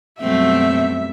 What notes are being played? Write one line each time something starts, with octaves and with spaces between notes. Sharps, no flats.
F#2 B2 F#3 G3 A3 C4 E5